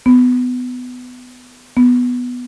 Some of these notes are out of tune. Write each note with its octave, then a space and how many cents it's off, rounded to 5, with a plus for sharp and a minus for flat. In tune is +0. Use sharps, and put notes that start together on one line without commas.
B3 +20
B3 +0